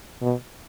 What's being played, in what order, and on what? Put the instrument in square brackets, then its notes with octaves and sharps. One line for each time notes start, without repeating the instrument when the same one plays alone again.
[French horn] B2